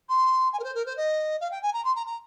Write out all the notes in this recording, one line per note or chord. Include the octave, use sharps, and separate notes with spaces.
C6
G#5
A#4
C5
A#4
C5
D#5
F5
G5
G#5
A#5
C6
A#5
A#5